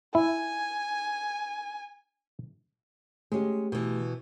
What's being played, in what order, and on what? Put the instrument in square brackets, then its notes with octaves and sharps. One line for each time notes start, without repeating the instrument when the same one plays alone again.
[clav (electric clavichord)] E4 [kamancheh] G#5
[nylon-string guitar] G#3 C#4 [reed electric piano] A3 G4
[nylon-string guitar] B2 E3